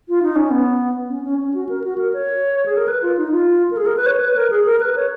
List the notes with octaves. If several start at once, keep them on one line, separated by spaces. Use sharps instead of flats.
F4
D#4
C#4
B3
C#4
C#4
C#4
F#4
A#4
F#4
A#4
C#5
G#4
A#4
B4
F4
D#4
F4
A#4
G#4
A#4
B4
C#5
B4
A#4
G#4
A#4
B4
C#5